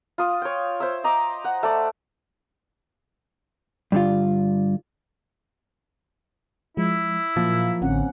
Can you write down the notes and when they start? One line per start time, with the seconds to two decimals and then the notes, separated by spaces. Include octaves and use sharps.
0.18 F4 D#6
0.42 C#5 G5
0.80 C5 E5 E6
1.04 D#5 A#5 D6
1.44 F#5
1.63 A3 D5
3.92 G2 D3 F4
6.77 F3 G#3 E4
7.37 A#2 F3 F#3 A#3 F5
7.82 A1 D3 C4 C#4 F#5